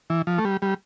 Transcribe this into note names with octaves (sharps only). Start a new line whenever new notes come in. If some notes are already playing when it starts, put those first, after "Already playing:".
E3
F3
A3
G3
G3